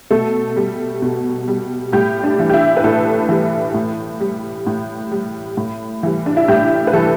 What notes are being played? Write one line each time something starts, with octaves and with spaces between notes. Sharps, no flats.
B2 A3 A4
G3
B2
G3
A2 G3 G4
D4
E3 G3
G4
E4
B4
A2 A3 A4
E3 G3
A2
G3
A2
G3
A2
E3 G3
D4
E4
A2 G3 G4
B4
E3 G3 A3 A4